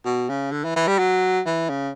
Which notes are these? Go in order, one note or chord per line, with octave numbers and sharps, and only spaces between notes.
B2
C#3
D3
E3
E3
G3
F#3
E3
C#3